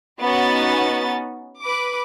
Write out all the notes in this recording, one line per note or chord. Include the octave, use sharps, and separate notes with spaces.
B3 C#4 D#4 F#4 A6
B4 D6